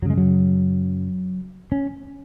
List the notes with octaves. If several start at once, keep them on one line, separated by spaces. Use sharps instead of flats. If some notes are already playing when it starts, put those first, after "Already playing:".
F#2 C#3 F#3 G#3
F#3
C#4